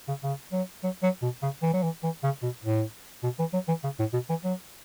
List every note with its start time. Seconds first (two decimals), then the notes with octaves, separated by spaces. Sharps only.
0.08 C#3
0.23 C#3
0.53 F#3
0.84 F#3
1.03 F#3
1.22 B2
1.42 C#3
1.63 E3
1.74 F#3
1.83 E3
2.03 E3
2.24 C#3
2.43 B2
2.64 A2
3.23 B2
3.39 E3
3.53 F#3
3.68 E3
3.84 C#3
3.99 A2
4.13 B2
4.30 E3
4.44 F#3